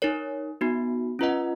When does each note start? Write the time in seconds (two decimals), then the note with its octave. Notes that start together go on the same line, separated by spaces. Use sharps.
0.02 D#4 A#4 C#5
0.61 B3 D#4 F#4
1.19 C#4 F4 B4 D#5 F#5